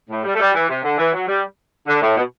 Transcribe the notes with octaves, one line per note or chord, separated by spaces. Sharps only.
A2
G3
A3
G3
E3
C3
D3
E3
F#3
G3
D3
A2
B2